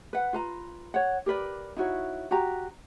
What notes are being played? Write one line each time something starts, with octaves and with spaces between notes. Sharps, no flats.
B4 F#5
F4 B4 A#5
C#5 F#5
G4 A#4 B4 D5
D#4 E4 F#4 C#5
F#4 G4 A#5